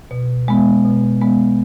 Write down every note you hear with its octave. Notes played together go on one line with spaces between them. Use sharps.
B2
G#3 B3
B2
G#3 B3